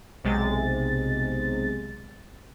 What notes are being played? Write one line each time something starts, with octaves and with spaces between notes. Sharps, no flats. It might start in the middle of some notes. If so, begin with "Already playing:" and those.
B1 C3 G#3 A6